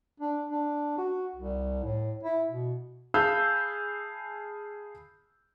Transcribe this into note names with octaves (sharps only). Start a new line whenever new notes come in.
D4
D4
F#4
C2
A2
E4
B2
G#4 F5 A5 B5 E6 G6